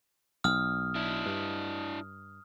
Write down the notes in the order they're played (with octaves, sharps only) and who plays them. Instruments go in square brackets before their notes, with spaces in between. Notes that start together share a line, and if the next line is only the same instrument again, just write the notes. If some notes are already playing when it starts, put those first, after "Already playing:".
[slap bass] B1 [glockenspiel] D#6 F6
[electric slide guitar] D4 E4
[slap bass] G2